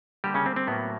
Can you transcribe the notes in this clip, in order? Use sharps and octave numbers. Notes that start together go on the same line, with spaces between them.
D3 G3 A#3 G4
C#3 C#4
C4
C4
A2 F#3 A#3 B3